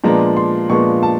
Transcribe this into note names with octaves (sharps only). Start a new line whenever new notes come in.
A#2 F3 G#3 B3 D4 A#5
C6
A#2 F3 G#3 B3 D4 C#6
A5